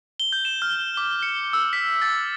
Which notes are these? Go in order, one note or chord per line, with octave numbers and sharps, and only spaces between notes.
G7
G6
E7
F6
D6
C#7
E6
B6
A6